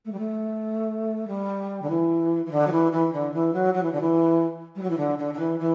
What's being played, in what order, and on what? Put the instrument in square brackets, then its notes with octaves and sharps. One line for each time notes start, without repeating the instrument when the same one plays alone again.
[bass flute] A3
G3
A3
G3
D3
E3
E3
D3
F#3
E3
E3
D3
E3
F#3
F#3
E3
D3
E3
G3
F#3
E3
D3
D3
D3
E3
E3